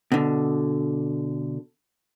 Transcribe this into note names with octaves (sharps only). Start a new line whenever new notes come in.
B2 D3